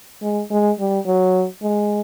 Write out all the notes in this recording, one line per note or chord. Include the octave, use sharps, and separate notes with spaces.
G#3
G#3
G3
F#3
G#3